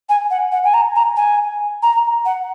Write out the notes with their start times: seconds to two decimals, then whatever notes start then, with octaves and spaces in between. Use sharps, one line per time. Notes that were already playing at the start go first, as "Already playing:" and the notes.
0.09 G#5
0.30 F#5
0.52 F#5
0.64 G#5
0.74 A#5
0.95 A#5
1.16 G#5
1.82 A#5
2.25 F#5